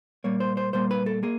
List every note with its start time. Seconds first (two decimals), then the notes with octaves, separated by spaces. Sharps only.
0.24 A#2 G3 A#3 C#5
0.40 C5
0.57 C5
0.73 A#2 G3 A#3 C5
0.91 B4
1.06 A4
1.23 A#3 G#4